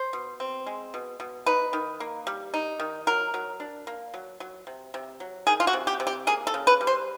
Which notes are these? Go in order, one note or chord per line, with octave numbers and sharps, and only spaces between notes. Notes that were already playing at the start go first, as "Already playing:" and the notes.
Already playing: C5
B2
C4
G#3
B2
B2
D#4 B4
D#3
A#3
G3
D#4
D#3
F#3 A#4
F#3
D4
A#3
F#3
F#3
C3
C3
F#3
D#3 G#4
F4
F#4
C3
G4
C3
G4
A#3 G#4
A4
C#3
B4
G3
C5